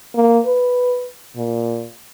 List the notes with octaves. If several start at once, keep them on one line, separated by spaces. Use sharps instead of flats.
A#3
B4
A#2